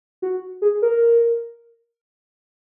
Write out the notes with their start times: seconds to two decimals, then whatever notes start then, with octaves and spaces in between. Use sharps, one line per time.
0.22 F#4
0.62 G#4
0.82 A#4